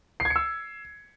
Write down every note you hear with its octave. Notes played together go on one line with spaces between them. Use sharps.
C7
G#6
C#7
E6